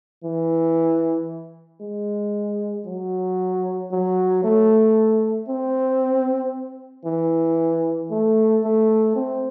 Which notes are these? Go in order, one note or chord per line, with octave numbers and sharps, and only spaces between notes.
E3
G#3
F#3
F#3
A3
C4
E3
A3
A3
C4